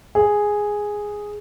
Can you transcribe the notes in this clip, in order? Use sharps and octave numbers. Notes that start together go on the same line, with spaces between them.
G#4